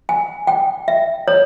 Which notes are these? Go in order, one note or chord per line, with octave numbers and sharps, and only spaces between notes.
G#5
G5
E5
C#5